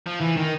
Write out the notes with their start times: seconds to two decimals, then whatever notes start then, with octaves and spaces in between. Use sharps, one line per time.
0.06 F3
0.20 E3
0.37 D#3